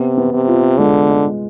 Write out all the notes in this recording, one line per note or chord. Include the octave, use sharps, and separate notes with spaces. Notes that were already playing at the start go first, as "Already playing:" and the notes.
Already playing: C3 B3
B3
C3
F4
D3 G#3
G#3